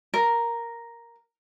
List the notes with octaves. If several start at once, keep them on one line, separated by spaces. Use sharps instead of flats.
A#4